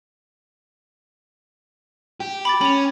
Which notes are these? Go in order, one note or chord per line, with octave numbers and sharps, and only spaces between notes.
G4
B5 D6 A6
C#4 B5 F7